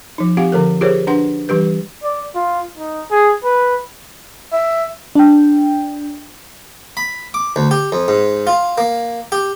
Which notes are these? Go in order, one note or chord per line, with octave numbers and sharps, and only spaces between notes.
F3 D#4
C4 F4 G4 F5 F#5
D3 F3 A4 A#4
F4 G4 G#4 A#4 C5 C#5
D4 B4 F#5 C6
E3 G3 G4 B4
D5
F4
D#4
G#4
B4
E5
D4 G5
B5
D6
D2
G4
F2
G#2
F4
A#3
G4